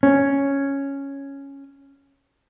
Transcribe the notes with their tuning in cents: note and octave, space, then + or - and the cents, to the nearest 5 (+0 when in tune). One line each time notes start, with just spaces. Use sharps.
C#4 +0